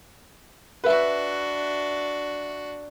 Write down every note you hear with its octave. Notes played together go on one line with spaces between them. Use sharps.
D4 F#4 B4 E5